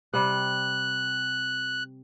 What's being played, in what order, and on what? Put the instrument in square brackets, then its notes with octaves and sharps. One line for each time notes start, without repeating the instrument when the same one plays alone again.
[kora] C3 G3 [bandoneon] F#6